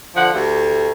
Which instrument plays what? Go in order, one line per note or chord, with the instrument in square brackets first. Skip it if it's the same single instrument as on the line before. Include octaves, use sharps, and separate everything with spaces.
[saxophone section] D3 F3 F4 F#5
D2 A3 G4